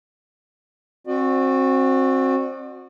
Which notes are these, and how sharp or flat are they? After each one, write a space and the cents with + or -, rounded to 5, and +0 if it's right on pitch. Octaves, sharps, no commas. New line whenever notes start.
C4 +25 F#4 -15 D5 +40